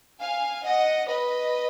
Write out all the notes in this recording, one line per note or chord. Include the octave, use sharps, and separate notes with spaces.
F5 G#5
D#5 F#5
B4 D#5